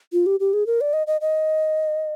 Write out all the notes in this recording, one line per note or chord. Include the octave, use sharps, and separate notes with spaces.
F4
G4
G4
G#4
A#4
D5
D#5
D#5
D#5